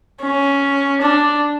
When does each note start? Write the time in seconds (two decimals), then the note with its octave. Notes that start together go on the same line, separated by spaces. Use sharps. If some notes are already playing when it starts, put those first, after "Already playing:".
0.22 C#4
1.01 D4